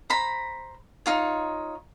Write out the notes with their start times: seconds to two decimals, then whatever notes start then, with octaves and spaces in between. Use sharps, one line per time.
0.10 C5 A#5 B5
1.06 D#4 F4 C#5